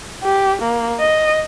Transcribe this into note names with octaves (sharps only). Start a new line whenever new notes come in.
G4
A#3
D#5